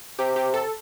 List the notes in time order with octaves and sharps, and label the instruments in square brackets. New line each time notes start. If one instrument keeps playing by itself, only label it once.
[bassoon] C3 [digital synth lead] G4
[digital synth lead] G4
A4